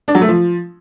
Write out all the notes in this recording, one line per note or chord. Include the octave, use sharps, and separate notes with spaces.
D4
F#3
A3
F3